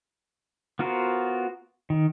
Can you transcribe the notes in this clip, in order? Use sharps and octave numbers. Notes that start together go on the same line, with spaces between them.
B3 F4 F#4 A#4 C5
D#3